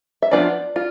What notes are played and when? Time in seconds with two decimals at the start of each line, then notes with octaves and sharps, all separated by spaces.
0.22 E5
0.31 F3 B3 D4 F4 D5
0.76 F4